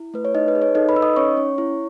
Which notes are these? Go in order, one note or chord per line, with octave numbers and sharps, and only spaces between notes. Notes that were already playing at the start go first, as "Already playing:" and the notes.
Already playing: E4
A3 B4
C#5
D#4 D#5
B4
G#4
C#5
D#4 A4 D#5
B4 B5
D#4 E6
D#5 D#6
C#4 C#5 C#6
C#4
E4